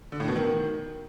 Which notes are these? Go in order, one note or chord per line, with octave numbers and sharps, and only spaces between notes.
D3
A2
B2
D#3